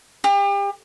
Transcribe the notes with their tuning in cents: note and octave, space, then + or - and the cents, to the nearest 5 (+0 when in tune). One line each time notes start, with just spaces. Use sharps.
G4 +35